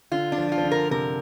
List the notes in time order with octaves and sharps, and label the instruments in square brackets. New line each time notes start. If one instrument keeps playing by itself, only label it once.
[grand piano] D3 [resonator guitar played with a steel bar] F4
[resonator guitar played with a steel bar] D4
[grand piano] F3
[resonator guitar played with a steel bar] F4
[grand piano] F3
D3
[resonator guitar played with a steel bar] A#4
[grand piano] C3 [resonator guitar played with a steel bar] A#4